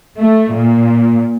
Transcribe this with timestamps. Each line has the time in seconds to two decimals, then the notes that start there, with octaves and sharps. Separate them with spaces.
0.18 A3
0.54 A#2